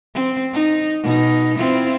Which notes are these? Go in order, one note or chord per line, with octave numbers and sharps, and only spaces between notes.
C4
D#4
B2 D#4
C4 E4 F4